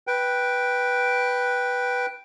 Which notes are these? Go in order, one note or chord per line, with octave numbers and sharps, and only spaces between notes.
B4 G5